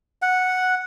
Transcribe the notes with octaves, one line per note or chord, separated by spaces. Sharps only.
F#5